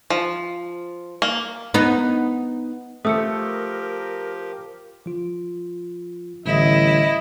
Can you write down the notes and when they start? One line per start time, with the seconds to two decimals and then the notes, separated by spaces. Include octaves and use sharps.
0.10 F3
1.22 A#3
1.74 B3 D#4
3.05 F3 A3 G4 A#4 D#6 E6 C#7
5.06 F3 F4
6.46 A1 D3 G3 E4 D#5